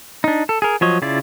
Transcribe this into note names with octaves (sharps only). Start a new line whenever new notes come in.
D4 D#4
A4
G#4 A#4
F3 F#3 C#5 D#5
C#3 E4 F4 D5